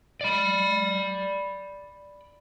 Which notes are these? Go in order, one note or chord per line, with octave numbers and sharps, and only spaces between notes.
D5 B5